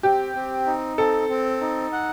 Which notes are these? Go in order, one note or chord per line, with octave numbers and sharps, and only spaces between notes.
C4 G4
C4
D#4
C4 A4
C4
D#4
F#5